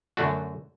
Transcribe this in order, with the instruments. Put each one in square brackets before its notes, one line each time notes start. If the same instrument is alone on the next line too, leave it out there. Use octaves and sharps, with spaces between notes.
[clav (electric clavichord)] F#2 D3 A3 D4 F#4